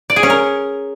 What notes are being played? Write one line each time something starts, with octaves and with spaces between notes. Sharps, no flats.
D5
G#4
C#4
A#4